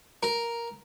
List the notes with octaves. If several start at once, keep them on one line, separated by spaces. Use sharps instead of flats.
A#4